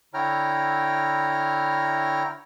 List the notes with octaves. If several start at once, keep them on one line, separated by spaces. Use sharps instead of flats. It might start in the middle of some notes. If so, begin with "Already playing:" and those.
D3 E4 C#5 G5 A#5 F6